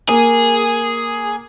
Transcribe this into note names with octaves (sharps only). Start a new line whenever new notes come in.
A#3 G#4